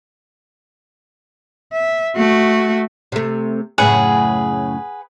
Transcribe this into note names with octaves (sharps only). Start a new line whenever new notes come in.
E5
A3 F#4
C3 A3
F#2 A2 C#3 G#4 B4 F#5